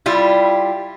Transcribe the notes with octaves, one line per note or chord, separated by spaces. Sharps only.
G3 E4 F4 G4